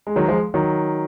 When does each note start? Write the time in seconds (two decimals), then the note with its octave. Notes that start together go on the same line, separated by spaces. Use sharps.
0.07 G#3
0.16 D#3 F#3
0.28 F3 G#3
0.54 D#3 F#3